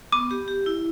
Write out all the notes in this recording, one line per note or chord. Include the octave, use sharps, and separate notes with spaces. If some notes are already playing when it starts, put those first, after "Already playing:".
B3 D6
G4
G4
E4